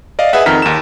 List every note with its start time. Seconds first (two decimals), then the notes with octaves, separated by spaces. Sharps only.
0.19 D5 D#5 F5
0.33 G#4 B4 D#5 E5 F#5
0.46 F2 D#3 A#5 F6 B6
0.62 D#2 E7